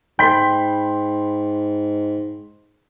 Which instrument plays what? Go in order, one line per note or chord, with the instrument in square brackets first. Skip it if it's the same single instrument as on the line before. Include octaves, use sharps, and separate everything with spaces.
[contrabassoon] G#2 [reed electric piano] G5 [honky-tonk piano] B5 C6 B6